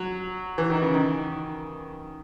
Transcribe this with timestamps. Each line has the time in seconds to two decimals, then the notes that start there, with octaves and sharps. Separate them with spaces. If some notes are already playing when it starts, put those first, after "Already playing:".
Already playing: F#3
0.58 E3
0.70 D#3
0.82 C#3
0.94 D#3